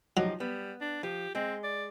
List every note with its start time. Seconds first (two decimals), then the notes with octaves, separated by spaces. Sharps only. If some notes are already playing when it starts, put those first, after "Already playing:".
0.17 F3 F#3 D#4 G4
0.40 G3 B3
0.81 D4
1.03 F3 G4
1.35 G#3 C4
1.63 D5